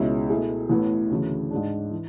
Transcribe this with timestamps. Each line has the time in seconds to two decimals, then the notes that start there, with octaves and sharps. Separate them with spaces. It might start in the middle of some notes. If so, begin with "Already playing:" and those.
Already playing: C#2 B2 G#3 C#4 E4
0.30 B2 A3 E4 G#4
0.69 A1 A2 E3 B3 E4
1.11 D2 C#3 E3
1.51 G#2 G#3 D4
1.91 E3